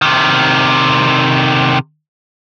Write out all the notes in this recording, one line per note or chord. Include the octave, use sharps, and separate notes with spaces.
C3 D#3